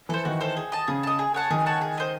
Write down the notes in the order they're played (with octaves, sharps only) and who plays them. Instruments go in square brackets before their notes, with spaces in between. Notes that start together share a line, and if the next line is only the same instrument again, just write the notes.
[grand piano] E3 [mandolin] A4 C5
[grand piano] D#3 [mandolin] F#4
[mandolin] A4 C5
G#4
D#5 A5
[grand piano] C#3 [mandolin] G#4
[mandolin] D#5 A5
G#4
C#5 F#5 A5
[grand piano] D#3 [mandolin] G#4
[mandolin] C#5 F#5 A5
G#4
C5 D#5